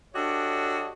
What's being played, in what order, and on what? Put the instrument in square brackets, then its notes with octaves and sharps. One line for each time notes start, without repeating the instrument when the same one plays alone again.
[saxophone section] D4 F#4 G4 A4 C#5 D#5